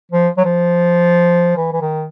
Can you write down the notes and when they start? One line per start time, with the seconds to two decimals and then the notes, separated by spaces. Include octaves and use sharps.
0.11 F3
0.37 F#3
0.44 F3
1.56 E3
1.72 E3
1.81 D#3